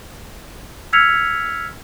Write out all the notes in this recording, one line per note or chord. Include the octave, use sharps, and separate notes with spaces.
E6 F6 G#6 B6 C#7 F7